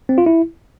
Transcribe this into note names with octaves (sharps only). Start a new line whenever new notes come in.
C4
F4
E4